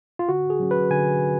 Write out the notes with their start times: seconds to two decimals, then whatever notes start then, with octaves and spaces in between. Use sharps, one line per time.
0.19 F4
0.29 D3 F#4
0.50 G#4
0.60 F#3 C#4
0.71 B4
0.91 D3 G#5
1.22 F#3